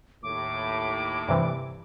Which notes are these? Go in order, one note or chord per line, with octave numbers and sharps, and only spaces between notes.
D#2 A2 D6
G2 C3 E3